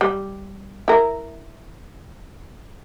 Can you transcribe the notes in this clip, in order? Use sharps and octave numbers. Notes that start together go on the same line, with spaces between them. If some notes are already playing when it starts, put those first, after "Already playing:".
G3
E4 A#4